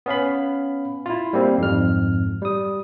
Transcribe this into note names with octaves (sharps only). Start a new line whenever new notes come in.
B3 C#4 F5 B5
E4 F4
G3 A#3 C4
F2 G#2 F6
G3 D#6